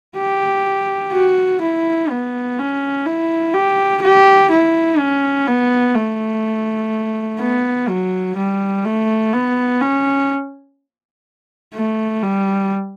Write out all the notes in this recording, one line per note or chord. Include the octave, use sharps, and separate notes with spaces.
G4
F#4
E4
B3
C#4
E4
G4
G4
E4
C#4
B3
A3
B3
F#3
G3
A3
B3
C#4
A3
G3